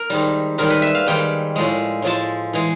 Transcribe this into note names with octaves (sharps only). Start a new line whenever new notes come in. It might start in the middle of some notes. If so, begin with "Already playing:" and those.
Already playing: A#4
G#2 D#3 G3
G#2 D#3 G3 A#4
B4
E5
F5
G#2 D#3 G3 G5
A2 F3 G#3
A2 F3 G#3 A5
E3 G#3